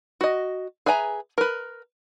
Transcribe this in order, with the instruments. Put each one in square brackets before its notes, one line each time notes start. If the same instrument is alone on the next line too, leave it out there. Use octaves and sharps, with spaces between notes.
[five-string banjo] F#4 D#5
G#4 B4 E5 G#5 A#5
A#4 B4